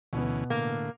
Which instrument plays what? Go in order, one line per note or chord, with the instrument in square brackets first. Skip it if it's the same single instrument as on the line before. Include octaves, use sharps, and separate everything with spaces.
[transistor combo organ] D2 E3 C#4 [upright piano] B2 B3
[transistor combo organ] A2 D3 [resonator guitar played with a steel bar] A#3